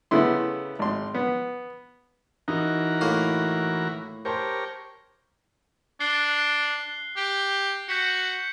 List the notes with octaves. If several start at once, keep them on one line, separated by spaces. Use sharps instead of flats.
C#3 A3 B3 E4 C6
G#1 C6
B3
E3 D#4 F#4 A#4
A2 A#3
G4 A#4 C5 C#5 A5 C6
D4 F#6 C7 G7
G4
F#4 G6 B6 C#7